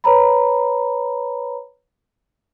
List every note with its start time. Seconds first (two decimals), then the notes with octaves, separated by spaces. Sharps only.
0.04 B4 C#5 A#5 B5